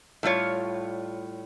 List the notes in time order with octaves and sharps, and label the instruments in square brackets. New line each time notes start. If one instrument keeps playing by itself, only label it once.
[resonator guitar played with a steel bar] A2 G3 F4 C#5